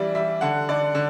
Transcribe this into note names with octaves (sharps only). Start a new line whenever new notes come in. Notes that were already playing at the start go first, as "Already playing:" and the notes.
Already playing: E3 G3 D5 E5
G3 E5
D3 F#5
D3 D5
D3